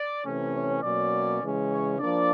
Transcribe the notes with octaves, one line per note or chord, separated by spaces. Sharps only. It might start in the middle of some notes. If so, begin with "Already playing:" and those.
Already playing: D5
C3 E3 A3 C#4
C#5
B2 F#3 A#3 C#4 D5
C#3 E3 G#3 C#4
C#5
F3 A#3 D4 D5